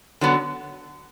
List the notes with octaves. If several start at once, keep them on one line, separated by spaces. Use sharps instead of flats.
D3 F#3 B3